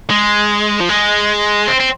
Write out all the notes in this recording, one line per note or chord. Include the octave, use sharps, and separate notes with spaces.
G#3
F3
G#3
C4
C4